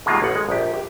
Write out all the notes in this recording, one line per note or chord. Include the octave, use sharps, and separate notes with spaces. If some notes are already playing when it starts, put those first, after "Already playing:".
B2 D#3 G3 G#3 A#3 F4
A1 F#5
G#3
A#1 G4
G4